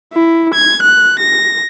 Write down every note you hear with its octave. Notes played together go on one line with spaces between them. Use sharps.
E4
G#6
F#6
A#6